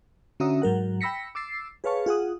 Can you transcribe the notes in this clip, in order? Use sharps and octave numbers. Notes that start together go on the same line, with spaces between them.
D3 C#4 F#4 E5 A#5 D#6
G#2 F#3 A#4 F#5
G5 B5 E6 A#6 B6 C#7
D6 E6 A6 C7
G#4 B4 C#5 F5 A5 C#6
F4 G#4 F#5 D#6